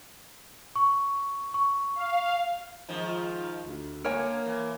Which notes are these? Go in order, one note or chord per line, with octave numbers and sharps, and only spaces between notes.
C#6
C#6
F5
G#2 D#3 F3
F4
D2
D3 A#3 A#4 C#5 G#5
E3